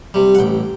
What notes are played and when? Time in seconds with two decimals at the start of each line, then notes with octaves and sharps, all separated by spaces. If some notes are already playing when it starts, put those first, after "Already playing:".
0.14 C3 G3
0.35 F#5
0.39 A1 G5